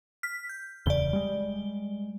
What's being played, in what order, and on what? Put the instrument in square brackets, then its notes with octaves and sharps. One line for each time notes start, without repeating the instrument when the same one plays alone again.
[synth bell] F6 B6
G6
[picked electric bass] D1 E2 C#3 [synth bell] D5 G7
[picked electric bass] G3 G#3